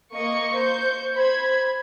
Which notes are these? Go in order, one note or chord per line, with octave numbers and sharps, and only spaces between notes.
A#3 D#5 C#6 C#7
C5 C#6 G6
C5 B5 G#6